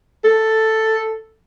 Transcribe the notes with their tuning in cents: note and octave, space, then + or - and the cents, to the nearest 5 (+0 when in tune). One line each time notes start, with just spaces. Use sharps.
A4 +5